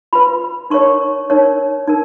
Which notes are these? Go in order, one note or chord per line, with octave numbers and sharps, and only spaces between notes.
F4 B4 B5
D#4 A#4 C#5 C#6
D#4 A#4 C#5
D#4 A#4